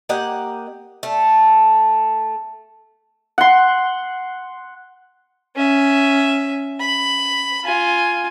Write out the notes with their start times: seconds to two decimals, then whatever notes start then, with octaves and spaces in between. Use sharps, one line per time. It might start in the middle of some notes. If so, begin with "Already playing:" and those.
0.09 A#3 G4 D#5 F#5
1.03 A3
3.38 F#5 C6
5.56 C#4 E5
6.80 B5
7.64 F4 G#5